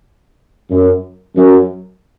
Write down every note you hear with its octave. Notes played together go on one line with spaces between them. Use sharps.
F#2
F#2